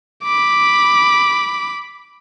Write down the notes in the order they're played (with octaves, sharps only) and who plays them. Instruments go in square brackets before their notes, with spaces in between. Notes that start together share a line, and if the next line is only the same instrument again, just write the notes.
[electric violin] B5 D6